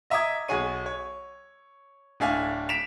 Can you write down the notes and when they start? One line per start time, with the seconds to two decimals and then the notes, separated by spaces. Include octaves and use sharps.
0.10 D#5 E5 A#5 D6 D#6 G#6
0.48 B1 F#4 G#4 C#5 D#7
0.86 C#5
2.20 D1 A2 D4 E5 F5 G#5
2.69 B6 D7 E7 F7